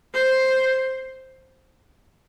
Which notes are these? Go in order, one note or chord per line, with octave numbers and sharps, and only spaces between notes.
C5